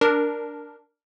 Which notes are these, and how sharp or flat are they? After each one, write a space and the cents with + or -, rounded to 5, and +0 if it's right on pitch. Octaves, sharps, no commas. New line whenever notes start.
D4 +0 A#4 +0